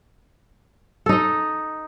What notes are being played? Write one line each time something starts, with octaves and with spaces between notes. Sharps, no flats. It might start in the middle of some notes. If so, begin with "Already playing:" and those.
D#4 A4 D#5